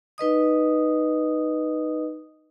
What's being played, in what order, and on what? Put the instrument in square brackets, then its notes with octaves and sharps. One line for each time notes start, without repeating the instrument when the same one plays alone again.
[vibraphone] D#4 B4 D#5 D#6